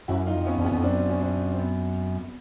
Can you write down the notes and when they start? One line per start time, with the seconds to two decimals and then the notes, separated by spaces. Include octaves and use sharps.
0.08 F#2 E4 F#4
0.27 D#4 F4
0.34 F2
0.45 B3 C#4
0.59 F2
0.65 B3 C#4
0.72 F2
0.83 F#2 C4 D4
1.10 C#4
1.21 C4 D4
1.52 C4
1.59 B3